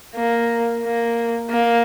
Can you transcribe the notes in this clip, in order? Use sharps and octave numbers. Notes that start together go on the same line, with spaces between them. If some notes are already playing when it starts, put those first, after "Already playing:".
A#3
A#3
A#3